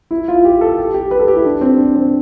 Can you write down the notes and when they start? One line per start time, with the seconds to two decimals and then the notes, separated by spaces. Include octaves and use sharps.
0.11 E4
0.28 F4
0.45 G4
0.61 A4
0.78 G4
0.94 G4
1.11 B4
1.19 A4
1.28 G4
1.36 E4
1.45 D4
1.61 C4
1.78 D4
1.96 C4